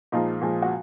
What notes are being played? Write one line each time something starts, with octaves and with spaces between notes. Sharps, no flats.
A#2 F3 G#3 D#4 F4
A#2 F3 G#3
F#4